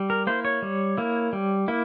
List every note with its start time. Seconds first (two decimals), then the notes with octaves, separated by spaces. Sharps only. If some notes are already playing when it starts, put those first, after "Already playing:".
Already playing: G3
0.10 A#4
0.27 A#3 E4 C5
0.45 C#5
0.62 G3
0.98 A#3 E4
1.33 G3
1.68 A#3 E4